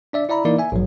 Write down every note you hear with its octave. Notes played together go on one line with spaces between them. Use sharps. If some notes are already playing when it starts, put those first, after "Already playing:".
D4 D5 E5
E4 D5 E5 A#5 B5
E3 A#3 D#4 E4 A#4 D5
E5 G#5
A#1 G#2 F#3